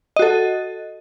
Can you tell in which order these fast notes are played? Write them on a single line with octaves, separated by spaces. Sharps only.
D#5 F#4 A4